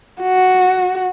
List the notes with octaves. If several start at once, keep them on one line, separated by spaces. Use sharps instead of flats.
F#4